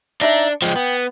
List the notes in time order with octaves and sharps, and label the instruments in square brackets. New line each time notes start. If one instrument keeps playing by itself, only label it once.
[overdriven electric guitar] D4 [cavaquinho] D#4 E5 A#5
[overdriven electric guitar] F3 G#3 [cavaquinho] G5
[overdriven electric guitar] B3